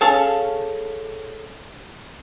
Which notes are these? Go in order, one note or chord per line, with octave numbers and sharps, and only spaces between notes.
C#4 G#4 A4 F5 A5